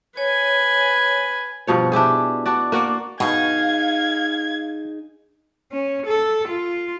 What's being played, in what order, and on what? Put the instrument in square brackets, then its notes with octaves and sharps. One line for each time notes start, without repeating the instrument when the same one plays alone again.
[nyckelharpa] B4 G#5 [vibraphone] C#5
[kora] G2 B2 F3 C#5
D4 E4 G4 G#4
D4 F#4 D5
A#3 F#4 D5 F#5
[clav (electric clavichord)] B2 [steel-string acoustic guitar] D#4 G#4 [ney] F5 [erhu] G#6
[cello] C#4
A4
F4